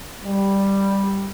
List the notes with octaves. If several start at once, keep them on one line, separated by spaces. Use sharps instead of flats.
G3